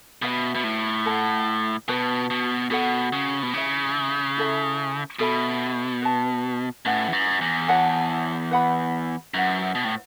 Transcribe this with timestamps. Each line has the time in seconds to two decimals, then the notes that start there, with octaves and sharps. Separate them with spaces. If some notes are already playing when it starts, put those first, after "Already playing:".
0.22 B2 F#4 B4 E5 B5
0.55 B2
0.64 A2
1.05 A4 F#5 A5
1.88 B2 F#4 B4 A5
2.30 B2
2.71 B2 F#4 A4 F#5
3.13 C#3
3.43 B2
3.54 C#3 E4 C#5 E5
4.37 E4 A4 E5
5.19 B2 A4 E5 B5
6.02 B4 A5
6.85 A2 C#4 E4 B4 F#5
7.08 E2
7.13 F#2
7.41 E2
7.68 E4 C#5 F#5 A5
8.51 B4 F#5 B5
9.34 F#2 E4 B4 F#5
9.75 B2
9.85 A2